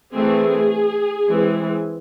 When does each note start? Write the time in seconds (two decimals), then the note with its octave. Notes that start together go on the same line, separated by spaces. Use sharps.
0.15 E3 A3 C4 G#4
1.29 E3 G#3 C4